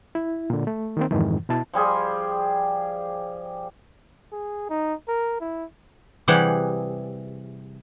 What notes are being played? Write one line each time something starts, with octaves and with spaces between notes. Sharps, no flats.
E4
A#2 D3
A3
D#3 A#3 C4
F2 G#2 C3 D#3 E3
B2 E4 A5
F3 G3 G#4
G#4
D#4
A#4
E4
C3 E3 G3 G4 G#4 F#5